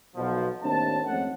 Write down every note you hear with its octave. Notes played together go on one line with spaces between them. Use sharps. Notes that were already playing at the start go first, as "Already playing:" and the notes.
B1 B2 F3
D#2 A2 C4 D4 A5
F2 G#2 A3 C#4 F#5